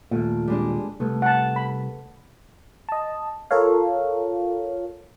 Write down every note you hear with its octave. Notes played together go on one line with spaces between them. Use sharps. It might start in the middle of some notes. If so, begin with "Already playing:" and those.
D#2 A#2 A3
G3 G#3 D4
C2 A3 B3
F#5 A5
B5
D#5 A5
F4 A4 A#4 C#5 F5